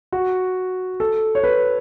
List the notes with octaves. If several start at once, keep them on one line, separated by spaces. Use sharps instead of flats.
F#4
A4
C#5
B4